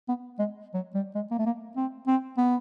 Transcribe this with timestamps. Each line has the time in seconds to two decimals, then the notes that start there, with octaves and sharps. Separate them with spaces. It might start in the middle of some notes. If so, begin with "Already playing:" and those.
0.08 B3
0.39 G#3
0.74 F#3
0.94 G3
1.15 G#3
1.31 A#3
1.39 A3
1.46 A#3
1.76 C4
2.07 C4
2.37 B3